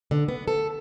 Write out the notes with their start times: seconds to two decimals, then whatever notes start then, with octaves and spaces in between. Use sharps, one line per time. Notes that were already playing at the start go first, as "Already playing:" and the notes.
0.11 D3
0.28 B3
0.48 A4